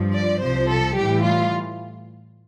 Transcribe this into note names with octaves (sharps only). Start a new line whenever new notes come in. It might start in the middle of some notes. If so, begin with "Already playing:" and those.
Already playing: G2 F3
D5
C2 C3 F3 C5
A4
A2 E3 G3 G4
F4